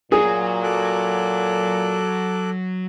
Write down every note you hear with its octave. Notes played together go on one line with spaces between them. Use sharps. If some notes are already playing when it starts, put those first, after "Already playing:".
A#2 F#3 G#4 C#5
A4 D6 F#6